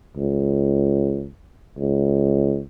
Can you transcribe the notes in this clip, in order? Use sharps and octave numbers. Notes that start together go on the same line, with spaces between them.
C#2
C#2